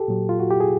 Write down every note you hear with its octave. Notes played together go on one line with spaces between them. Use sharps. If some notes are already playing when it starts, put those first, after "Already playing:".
Already playing: G4 A4
A#2 F#3
F4
F#4
G4
G#4